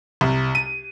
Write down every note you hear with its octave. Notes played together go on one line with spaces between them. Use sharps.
C2
D#7